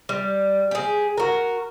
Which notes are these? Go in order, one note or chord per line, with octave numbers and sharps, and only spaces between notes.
G3
G4 G#4
F#4 A#4